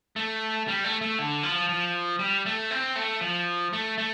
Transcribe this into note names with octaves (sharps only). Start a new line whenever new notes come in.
A3
G3
A3
A3
D3
F3
F3
G3
A3
C4
A3
F3
A3
A3